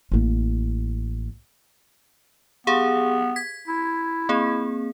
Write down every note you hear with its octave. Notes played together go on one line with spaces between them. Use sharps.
A1 A#3
B3 G4 G#4 F5
G#6 B6
E4
A#3 C4 G#4